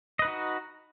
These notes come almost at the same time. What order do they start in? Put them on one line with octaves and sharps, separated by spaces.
D#5 B4 D#4 F#4